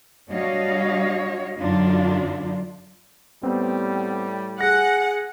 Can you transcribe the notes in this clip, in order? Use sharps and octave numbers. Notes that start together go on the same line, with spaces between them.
G3 D4 F#4 C#5 D#5 F5
F#2 D3 F#3 D4 D#4 F4
A2 G3 B3 C4
G#4 F#5 A#6